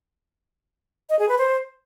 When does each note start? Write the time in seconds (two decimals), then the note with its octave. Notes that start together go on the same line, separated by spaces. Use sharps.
1.10 D#5
1.19 G#4
1.29 B4
1.38 C5